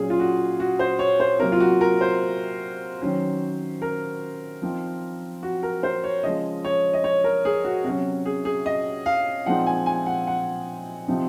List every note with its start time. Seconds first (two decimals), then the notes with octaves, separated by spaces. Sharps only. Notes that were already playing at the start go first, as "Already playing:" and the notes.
Already playing: A#2 F#3 C#4 G#4
0.10 F4
0.19 F#4
0.60 F#4
0.79 C5
0.99 C#5
1.20 C5
1.40 C3 F#3 A#3 A#4
1.52 F4
1.60 F#4
1.81 A#4
2.01 C5
3.02 D#3 F#3 C#4
3.82 A#4
4.62 F3 C4 D#4
5.43 F#4
5.63 A#4
5.83 C5
6.04 C#5
6.23 C#3 F3 G#3 D#5
6.65 C#5
6.93 D#5
7.04 C#5
7.24 A#4
7.45 G#4
7.64 F#4
7.84 C3 F#3 C#4 F#4
8.26 G#4
8.45 G#4
8.66 D#5
9.06 F5
9.46 A#2 F3 G#3 C4 D#4 F#5
9.66 G#5
9.86 G#5
10.06 F#5
10.27 F#5
11.08 C3 F3 C4 D#4